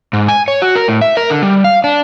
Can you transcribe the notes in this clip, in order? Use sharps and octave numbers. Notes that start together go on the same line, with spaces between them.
G#2
G#5
C#5
F#4
A#4
A2
E5
A#4
D3
G3
F5
D4